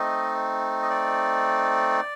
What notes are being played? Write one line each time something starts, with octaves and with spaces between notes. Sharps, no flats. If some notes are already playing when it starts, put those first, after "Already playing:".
Already playing: A3 C4 D#4 D#5
D#5
D5